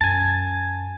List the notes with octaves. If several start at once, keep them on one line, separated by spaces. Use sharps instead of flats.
F#2 B2 G#5 A5